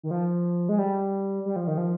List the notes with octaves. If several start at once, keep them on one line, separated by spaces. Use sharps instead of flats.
D#3
F3
G#3
G3
G3
F3
D#3
F3